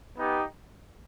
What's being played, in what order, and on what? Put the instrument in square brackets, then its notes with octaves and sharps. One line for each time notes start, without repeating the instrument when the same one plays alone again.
[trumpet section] B3 D#4 G4